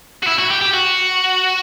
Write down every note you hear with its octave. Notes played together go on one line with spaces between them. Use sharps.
F#4
E4
F#4
G4
G4
F#4